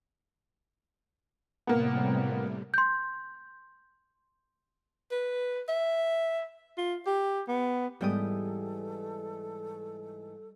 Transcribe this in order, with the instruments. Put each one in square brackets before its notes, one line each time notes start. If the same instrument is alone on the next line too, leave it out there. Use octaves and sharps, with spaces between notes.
[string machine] A2 C3 G3 [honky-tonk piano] A#3 B3
[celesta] C6 G6
[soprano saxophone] B4
E5
F4
G4
B3
[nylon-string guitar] G#2 E3 B3 [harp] G3 G5 D#6 [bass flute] A4